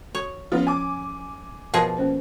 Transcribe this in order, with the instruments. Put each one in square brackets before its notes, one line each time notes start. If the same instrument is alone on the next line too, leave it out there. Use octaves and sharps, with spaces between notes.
[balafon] F#4 [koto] C#5
[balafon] F3 C#4 [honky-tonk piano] B3 F4
[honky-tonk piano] G#5 D6
[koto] B2 F3 G#4 [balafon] A#4
[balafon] A#3 C#4 C5